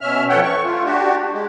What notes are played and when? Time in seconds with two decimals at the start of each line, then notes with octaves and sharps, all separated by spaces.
0.01 B2 C#4 E5 F6
0.29 F2 E3 A4 C#5 F#5 G5
0.43 C#6
0.65 A3 F4
0.85 D4 F#4 G4
1.33 G#3